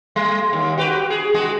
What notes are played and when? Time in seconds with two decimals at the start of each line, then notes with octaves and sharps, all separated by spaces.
0.16 G3
0.53 D#2
0.78 F#4 G4 B4
1.10 G#4
1.34 G#3 F#4 G#4